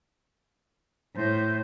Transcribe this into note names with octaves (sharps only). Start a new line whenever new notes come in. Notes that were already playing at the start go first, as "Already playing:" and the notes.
A2 C5 G6